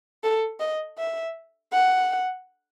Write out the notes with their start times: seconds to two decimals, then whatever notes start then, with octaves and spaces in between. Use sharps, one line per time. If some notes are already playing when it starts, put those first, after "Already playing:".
0.23 A4
0.60 D#5
0.98 E5
1.72 F#5